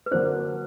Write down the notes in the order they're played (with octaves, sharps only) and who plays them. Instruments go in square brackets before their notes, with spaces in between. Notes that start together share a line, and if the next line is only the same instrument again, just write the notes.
[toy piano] B4
[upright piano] D3 F#3 A#3 D4 [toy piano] C5